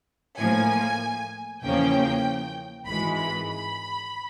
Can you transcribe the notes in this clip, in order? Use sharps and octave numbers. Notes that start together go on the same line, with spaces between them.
A2 F3 A#3 G#5
E2 C#3 F3 A#3 C#4 G5
G#1 G#2 E3 G#3 B5
B5
B5